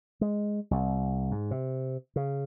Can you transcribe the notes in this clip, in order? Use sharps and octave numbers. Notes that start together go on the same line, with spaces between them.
G#3
C2
G#2
C3
C#3